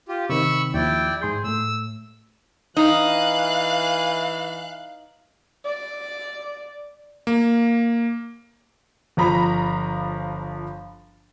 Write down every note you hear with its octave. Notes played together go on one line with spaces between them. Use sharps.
F4 G4
C3 D#3 C4 B5 C#6 E6
D#2 F3 E4 D5 G5
G#2 G#4 C6 G6
A2 A3 E6
E3 D#4 F5 F#6
D5
A#3
G1 F3 A#5 B5